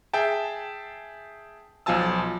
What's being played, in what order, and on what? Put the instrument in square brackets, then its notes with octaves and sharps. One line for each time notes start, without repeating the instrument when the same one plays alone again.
[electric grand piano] G#4 E5 G5 A5
B1 F3 F4 G#5 A5 E6